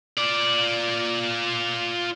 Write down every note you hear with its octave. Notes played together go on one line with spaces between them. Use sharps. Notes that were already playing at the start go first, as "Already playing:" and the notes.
F4 D5